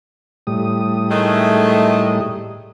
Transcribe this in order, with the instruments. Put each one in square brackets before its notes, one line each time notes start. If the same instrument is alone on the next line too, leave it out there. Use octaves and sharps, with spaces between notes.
[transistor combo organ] A2 G3 D#6
[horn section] D#3 G#3 A3